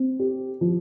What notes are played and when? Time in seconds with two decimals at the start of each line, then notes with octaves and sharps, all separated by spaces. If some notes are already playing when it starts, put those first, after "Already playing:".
Already playing: C4
0.19 G4
0.61 F3